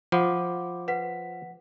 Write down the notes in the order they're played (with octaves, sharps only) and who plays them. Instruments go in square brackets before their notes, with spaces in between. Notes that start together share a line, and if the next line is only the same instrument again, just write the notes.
[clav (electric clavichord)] F3 [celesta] F#5 B5 D6
[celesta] B4 F#5 B6